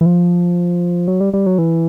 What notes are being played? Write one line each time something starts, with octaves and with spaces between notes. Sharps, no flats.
E3
F3
F#3
G3
G3
F#3
E3